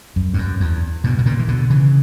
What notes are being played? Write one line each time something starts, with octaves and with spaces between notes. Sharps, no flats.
F#2
G2
F#2
E2
G2 B2
B2
A#2 C#3
E3
B2 D3
C#3 E3